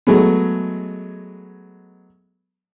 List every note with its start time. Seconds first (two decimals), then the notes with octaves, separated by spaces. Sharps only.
0.07 F#3 G#3 A3 B3